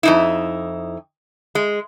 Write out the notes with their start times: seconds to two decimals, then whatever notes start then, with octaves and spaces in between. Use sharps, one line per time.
0.03 F2 D#4 E4
1.55 G#3